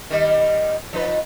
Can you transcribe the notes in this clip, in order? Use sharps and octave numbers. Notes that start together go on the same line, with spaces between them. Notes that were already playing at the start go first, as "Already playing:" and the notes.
D#3 G3
F3 D#4 B4